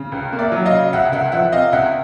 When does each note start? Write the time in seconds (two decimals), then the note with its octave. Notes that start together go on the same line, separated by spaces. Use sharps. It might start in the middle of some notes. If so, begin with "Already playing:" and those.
Already playing: C#3
0.12 C#2
0.33 A#3
0.39 D5 E5
0.52 F#3
0.65 D#5 F5
0.72 C#3
0.93 C#2 E5 F#5
1.12 C#2 E5 F#5
1.32 F3 E5 F#5
1.52 C3 D#5 F5
1.72 C#2 E5 F#5